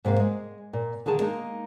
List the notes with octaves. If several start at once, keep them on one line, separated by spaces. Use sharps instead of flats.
G#2 C3 A#3 F5
G#3
A#2
D3 D#3 A#3 G#4 A5
G#3 A#3 D#4